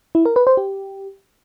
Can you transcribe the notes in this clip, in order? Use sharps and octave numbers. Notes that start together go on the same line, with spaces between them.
E4
A#4
B4
C5
G4